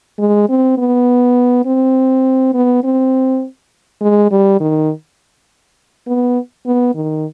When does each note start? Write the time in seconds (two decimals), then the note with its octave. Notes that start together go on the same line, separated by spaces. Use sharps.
0.19 G#3
0.49 C4
0.78 B3
1.66 C4
2.54 B3
2.84 C4
4.01 G#3
4.31 G3
4.60 D#3
6.07 B3
6.66 B3
6.95 D#3